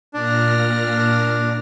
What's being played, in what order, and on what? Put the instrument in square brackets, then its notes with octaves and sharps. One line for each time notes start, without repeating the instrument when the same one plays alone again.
[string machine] A#2 F6 A#6 [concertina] D4